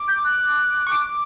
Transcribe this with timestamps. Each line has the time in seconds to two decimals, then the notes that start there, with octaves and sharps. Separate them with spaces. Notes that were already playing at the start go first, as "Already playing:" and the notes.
Already playing: D6
0.08 G6
0.25 F#6
0.87 C#6
0.92 D6